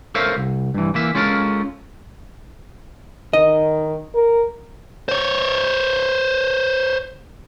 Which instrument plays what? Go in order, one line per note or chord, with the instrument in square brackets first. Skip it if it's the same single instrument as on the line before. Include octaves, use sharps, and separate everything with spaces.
[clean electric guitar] A4 A#4 C5 C#5 E5 F5
C2
G2 E3
E3 A#3 E5
G#3 C#4 F4 A4 A#4
[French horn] D#3 [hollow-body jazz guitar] D#5
[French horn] A#4
[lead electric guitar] C5 C#5